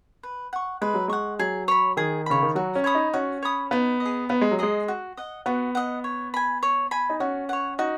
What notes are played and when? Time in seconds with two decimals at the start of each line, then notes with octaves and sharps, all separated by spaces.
0.23 B4
0.53 F#5 C#6
0.82 G#3 B4
0.94 F#3
1.08 G#3 F#5 C#6
1.39 F#3 G#4
1.68 C#5 B5
1.97 D#3 G#4
2.26 C#3 C#5 B5
2.43 D#3
2.55 F#3 F#4
2.75 C#4
2.84 C#5 B5 D#6
2.95 D#4
3.14 C#4 F#4
3.43 C#5 B5 D#6
3.71 B3 D#4
4.00 D#5
4.05 G#4
4.29 B3 D#4
4.41 G#3
4.51 F#3
4.59 G#3 G#4 D#5
4.88 F#4
5.17 D#5 F#5
5.46 B3 F#4
5.75 D#5 F#5
6.04 C#5
6.34 G#5 B5
6.63 C#5
6.91 G#5 B5
7.10 D#4
7.20 C#4 F#4
7.49 C#5 F#5
7.79 D#4 F#4